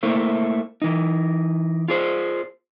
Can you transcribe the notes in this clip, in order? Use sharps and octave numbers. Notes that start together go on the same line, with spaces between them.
A3 A#3 E4 C5
E3 D#4
F4 G#4 C5